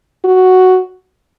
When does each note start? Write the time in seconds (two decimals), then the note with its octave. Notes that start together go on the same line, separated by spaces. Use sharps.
0.24 F#4